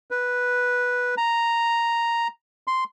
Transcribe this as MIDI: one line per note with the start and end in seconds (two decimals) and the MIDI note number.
0.11 1.15 71
1.18 2.28 82
2.67 2.84 84